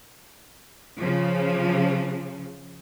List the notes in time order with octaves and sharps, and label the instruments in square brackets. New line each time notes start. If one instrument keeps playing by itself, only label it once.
[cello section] C#3 F3